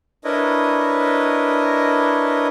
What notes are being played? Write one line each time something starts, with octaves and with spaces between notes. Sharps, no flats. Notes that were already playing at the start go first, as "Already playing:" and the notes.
D4 E4 A#4 B4 C#5 D#5